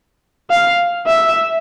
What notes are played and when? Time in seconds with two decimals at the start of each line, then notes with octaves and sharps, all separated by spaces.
0.50 F5
1.07 E5